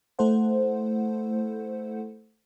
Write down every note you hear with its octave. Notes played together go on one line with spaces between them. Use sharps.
A3 E4 A4 C5 F#5